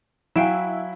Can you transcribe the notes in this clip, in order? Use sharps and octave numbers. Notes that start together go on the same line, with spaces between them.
F#3 E4 F5 G5 G#5 D7 E7